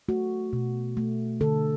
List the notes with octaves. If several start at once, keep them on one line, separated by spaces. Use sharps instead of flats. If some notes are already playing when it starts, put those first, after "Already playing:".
A3 F#4
B2
A3
D3 A4